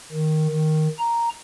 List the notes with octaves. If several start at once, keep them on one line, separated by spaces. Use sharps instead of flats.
D#3
D#3
A#5